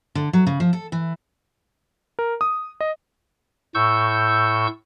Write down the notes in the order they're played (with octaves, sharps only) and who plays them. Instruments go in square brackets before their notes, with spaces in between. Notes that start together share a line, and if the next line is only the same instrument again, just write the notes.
[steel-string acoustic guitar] D3
F#3
C#3
F3
A4
E3
[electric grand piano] A#4
D#6
D#5
[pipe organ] A2 C#6 E6 G6